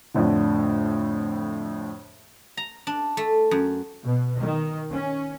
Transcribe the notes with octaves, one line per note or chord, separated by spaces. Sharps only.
F2 A2 D3
A#5
D4
A3
F#2
B2
D#3
C#4